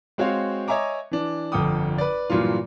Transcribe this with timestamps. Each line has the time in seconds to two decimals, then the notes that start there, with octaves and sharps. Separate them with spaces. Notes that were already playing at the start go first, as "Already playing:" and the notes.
0.18 G#3 C4 F#4 C#5 F5
0.68 C#5 D#5 E5 G#5 A#5 D6
1.11 E3 D4
1.52 G1 F2 A4 G5 D6 D#6
1.98 B4 D5
2.30 G2 A#2 E3 F#3 F4